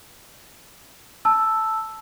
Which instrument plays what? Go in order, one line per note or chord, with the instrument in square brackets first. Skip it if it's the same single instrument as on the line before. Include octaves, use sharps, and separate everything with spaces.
[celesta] A5 E6